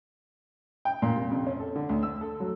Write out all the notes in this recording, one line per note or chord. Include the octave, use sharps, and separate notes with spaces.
G5
A#2
C3
F2
C#4
A4
D3
D2
E6
A4
F#3